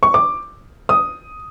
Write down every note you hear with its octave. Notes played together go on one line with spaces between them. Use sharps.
C#6
D6
D#6